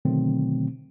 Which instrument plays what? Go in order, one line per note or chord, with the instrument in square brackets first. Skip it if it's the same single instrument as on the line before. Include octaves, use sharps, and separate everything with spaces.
[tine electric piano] B2 D3 D#3 F#3 A3 C4